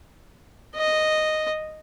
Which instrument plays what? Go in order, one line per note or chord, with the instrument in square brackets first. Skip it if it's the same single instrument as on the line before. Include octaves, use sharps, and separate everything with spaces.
[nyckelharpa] D#5